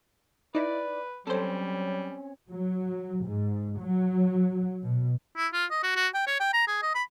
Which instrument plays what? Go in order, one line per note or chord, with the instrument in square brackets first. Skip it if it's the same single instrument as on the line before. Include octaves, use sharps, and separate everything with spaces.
[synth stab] D#4 E4 [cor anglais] B4 [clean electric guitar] D5
[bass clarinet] F#3 [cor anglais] G3 [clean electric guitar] C4 C#4 [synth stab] A4 C5
[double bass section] F#3
G#2
F#3
B2
[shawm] E4
F4
D#5
F#4
F#4
G5
C#5
G5
A#5
G#4
D#5
B5